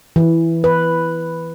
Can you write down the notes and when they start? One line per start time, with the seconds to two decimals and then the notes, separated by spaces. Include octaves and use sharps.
0.16 E3
0.64 B4